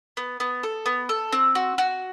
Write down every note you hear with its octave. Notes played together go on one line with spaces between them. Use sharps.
B3
B3
A4
B3
A4
C4
F#4
F#4